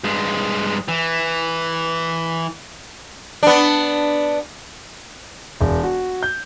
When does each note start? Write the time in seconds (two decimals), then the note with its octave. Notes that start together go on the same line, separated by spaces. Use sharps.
0.04 G2 G#3
0.88 E3
3.43 B3 D4
5.61 E1
5.83 F#4
6.23 G6